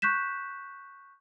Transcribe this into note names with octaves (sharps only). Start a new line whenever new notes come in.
C#6 F#6 G6 B6 E7